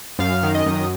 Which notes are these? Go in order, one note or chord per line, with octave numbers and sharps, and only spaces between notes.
F#2 F5
D#3
D#5
F#2